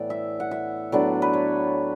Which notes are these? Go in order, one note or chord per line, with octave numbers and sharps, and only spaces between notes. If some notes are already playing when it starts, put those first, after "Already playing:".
Already playing: A2 E3 B3 D5
E5
F#5
E5
A2 F#3 B3 D4 D5
B4
C#5